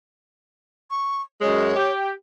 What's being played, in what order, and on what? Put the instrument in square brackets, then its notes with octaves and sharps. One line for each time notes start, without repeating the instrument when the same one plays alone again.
[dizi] C#6
[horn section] F#2 G#3 [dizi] C#5
[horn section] G4